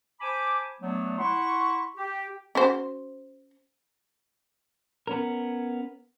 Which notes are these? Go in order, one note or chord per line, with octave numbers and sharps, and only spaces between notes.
C5 G#5 A5 B5 D6
F#3 A3 B3 D4
E4 F#5 C6 C#6
G4
C#4 F#4 C5
B3 C#4 A#4